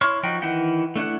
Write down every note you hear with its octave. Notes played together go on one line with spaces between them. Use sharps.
E4 C#5 C6 C#6 F6
F3 D#4 F#4 G5
D#3 E3 E4 F#5 G5
A3 D4 E4 F#5